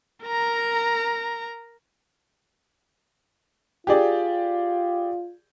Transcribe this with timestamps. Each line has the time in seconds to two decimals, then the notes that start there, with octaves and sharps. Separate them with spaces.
0.25 A#4 A#5
3.87 F4 G4 G#4 D5